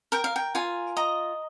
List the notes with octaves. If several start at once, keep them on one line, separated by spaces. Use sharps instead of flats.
A#4 G5
F5
G5
F4 G#5
D#5 A#5